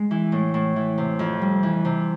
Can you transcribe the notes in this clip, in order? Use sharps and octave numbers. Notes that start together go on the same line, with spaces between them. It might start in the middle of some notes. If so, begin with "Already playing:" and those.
Already playing: G#3
E3
A2
A2
E3
C3
F2
G3
E3
C3